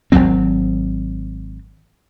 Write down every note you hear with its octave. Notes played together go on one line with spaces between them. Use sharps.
G#1 E2 F#3 C4